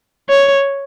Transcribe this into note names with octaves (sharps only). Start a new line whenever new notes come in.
C#5